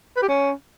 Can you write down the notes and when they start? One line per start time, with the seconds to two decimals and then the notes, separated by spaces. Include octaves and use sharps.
0.16 B4
0.22 G4
0.28 C#4